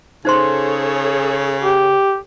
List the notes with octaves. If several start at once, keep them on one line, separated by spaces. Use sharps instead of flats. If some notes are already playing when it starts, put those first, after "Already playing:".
C#3 D#4 G#4 A4 C5 C#5 C6
G4